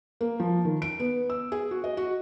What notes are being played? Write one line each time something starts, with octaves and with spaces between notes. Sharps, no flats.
A#3
F3
D#3
D7
B3
E6
G#4
F#4
D#5
F#4